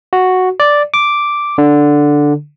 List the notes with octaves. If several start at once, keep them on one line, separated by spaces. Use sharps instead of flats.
F#4
D5
D6
D3